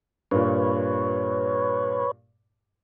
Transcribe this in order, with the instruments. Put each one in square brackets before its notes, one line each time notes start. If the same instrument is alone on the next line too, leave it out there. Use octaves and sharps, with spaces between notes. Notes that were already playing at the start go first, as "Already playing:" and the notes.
[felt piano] G2 A#2 [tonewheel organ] B4 C#5